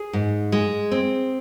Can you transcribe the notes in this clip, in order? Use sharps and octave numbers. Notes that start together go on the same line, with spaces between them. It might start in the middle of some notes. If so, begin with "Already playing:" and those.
Already playing: G#4
G#2
G#3
C4